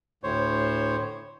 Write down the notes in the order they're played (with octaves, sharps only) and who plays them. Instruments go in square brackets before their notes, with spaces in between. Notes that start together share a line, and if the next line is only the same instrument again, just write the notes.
[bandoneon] D2 A2 C5 C#5